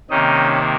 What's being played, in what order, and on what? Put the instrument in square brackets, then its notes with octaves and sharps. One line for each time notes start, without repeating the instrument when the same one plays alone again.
[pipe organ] C3 D#3 A#3 C#4 D#4 D#5